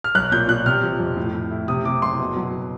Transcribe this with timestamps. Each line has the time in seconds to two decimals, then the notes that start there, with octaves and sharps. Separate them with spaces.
0.04 F6
0.15 B1 F#6
0.32 A#2 G6
0.48 A#2 F#6
0.66 C3 F6
0.83 F3
1.00 F2
1.17 A2
1.34 A2
1.51 E4
1.68 C3 D#6
1.85 C3 D6
2.02 F#1 C6
2.19 B2
2.36 F#3